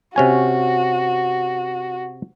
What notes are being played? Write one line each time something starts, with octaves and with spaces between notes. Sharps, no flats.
C3 C#4 F#4 G#5